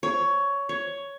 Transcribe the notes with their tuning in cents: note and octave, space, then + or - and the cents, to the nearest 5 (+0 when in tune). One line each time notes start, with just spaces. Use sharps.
C#5 +15
C#5 +10